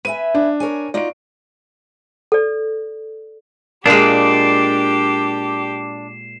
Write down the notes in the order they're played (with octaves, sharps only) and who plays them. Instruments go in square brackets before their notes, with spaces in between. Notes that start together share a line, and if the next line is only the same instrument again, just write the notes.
[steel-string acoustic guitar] B4 E5 G#5 [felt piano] D#7
[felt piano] D4
[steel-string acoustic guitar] A#4 C#5 G#5
[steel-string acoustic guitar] D#4 F4 F#4 [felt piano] D5 D7
[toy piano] A4 D5
[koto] A#2 G#3 [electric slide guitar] D4 [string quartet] G4 [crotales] C7 E7